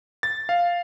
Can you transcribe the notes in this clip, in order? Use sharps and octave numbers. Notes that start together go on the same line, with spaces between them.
A6
F5